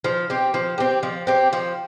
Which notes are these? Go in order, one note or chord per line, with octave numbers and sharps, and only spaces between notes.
F3
C4 G4
F3
C4 G4
F3
C4 G4
F3